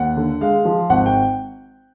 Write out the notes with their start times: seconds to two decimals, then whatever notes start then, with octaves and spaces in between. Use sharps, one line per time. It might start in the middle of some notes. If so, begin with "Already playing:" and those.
Already playing: D#2 F#5
0.17 D3
0.41 G#3 F5
0.65 F3
0.90 G#1 F#5
1.06 G5